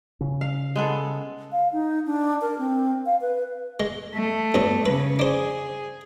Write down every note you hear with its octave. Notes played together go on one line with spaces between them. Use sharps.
C#3 C#4
F5
G#3 B3 A4
F5
D#4
D4
A#4
C4
F5
B4
G#3
A3
G2 F#3 B3
C#3 C#4 B4
D4 G#4 C5